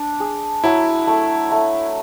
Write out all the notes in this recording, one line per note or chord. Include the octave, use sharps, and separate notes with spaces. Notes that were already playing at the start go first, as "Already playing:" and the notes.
Already playing: D4
G#4
F#3 E4
A3
A3